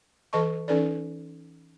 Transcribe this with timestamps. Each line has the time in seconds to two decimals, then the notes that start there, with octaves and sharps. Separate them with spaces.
0.33 E3 A4 D#5 A5 C#6
0.68 E3 C#4 D#4 A4 B4 D5